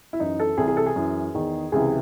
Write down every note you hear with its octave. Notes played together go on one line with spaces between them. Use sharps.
E4
F#2 E3 D#4
A4
C2 C3 E3 G#4
G#4
A4
G#4
F#2 E3
E2 D#3
C#2 C3 E3 G#4